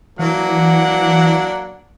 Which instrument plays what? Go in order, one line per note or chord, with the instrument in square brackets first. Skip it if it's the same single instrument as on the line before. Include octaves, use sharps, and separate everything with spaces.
[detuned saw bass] E3 [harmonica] F#3 A#3 D4 [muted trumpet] F#5